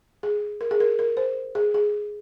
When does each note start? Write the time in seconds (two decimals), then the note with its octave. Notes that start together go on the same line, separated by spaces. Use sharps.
0.23 G#4
0.61 A#4
0.71 G#4
0.80 A#4
0.99 A#4
1.17 C5
1.55 G#4
1.74 G#4